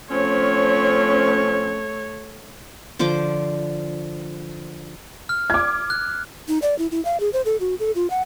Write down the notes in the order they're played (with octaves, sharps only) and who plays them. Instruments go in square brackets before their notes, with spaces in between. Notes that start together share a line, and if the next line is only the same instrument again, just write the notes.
[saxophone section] F3 C4 C#4 [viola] A3 C#5
[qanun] D3 F3 C5 D6
[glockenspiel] F6
[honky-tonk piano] D6 G#6
[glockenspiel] F#6
[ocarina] D#4
D5
E4
E4
F5
G#4
C5
A4
F#4
A4
F4
F#5